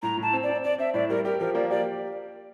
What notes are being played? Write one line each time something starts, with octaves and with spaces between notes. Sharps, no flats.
A2 A#5
A2 A5
C4
D5
C4
C4 D5
C4 E5
A2 D5
G3 A#4
G4 A#4
F3 A#4
A#3 D5
G4 D5